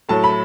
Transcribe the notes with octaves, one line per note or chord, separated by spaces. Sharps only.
A2 F#3 A3 A5
B5